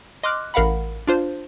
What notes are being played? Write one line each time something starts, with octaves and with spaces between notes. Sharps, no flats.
D#5 C6 D6 F6 F#6
A1 A#4 F5 F#5 B5
D4 F4 C5